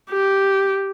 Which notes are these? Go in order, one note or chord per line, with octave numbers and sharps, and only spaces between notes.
G4